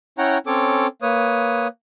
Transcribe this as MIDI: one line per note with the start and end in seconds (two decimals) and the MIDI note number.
0.18 0.38 61
0.18 0.38 64
0.18 0.38 73
0.18 0.38 78
0.18 0.38 79
0.18 0.38 82
0.47 0.87 60
0.47 0.87 61
0.47 0.87 69
0.47 0.87 73
0.47 0.87 86
1.02 1.67 58
1.02 1.67 71
1.02 1.67 73
1.02 1.67 87